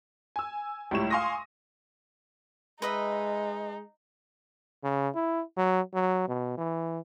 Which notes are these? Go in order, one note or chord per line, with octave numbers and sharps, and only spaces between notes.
G#5 E6
C#2 A2 G3 C#5 E7
F5 G#5 C6 C#6 D#6 A#6
G#3 D#4 B4 D#5 E5
C#3
E4
F#3
F#3
B2
E3